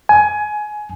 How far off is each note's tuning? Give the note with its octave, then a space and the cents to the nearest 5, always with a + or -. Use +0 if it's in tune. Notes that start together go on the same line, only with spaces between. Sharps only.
G#5 +20